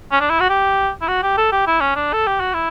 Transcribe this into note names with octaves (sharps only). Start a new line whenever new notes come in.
C#4
D4
E4
F#4
G4
E4
F#4
G4
A4
G4
E4
C#4
D4
A4
G4
F#4
E4